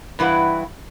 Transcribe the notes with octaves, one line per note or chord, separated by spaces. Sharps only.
G2 E3 E4 B4 F#5